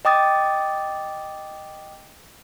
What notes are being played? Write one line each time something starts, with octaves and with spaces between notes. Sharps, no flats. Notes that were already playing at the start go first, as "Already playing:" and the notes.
D#5 G5 D6 D#6 A6